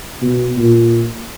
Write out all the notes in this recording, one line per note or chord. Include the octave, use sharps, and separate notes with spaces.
B2
A#2